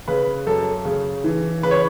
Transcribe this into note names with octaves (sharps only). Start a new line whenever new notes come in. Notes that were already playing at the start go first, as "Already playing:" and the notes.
C#3 B4
F#2 A4
C#3
E3
C#3 B4
C#5